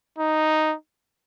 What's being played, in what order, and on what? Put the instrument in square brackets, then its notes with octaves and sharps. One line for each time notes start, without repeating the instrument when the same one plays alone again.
[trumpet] D#4